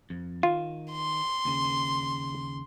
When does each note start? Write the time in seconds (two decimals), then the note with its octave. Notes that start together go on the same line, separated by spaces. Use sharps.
0.10 F2
0.43 D#3 F4
0.92 C6
1.45 D#2 C#3